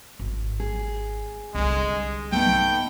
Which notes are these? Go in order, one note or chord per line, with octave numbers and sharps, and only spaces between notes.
G#1
G#4
C2 D3 G#3
A3 B3 D#4 G5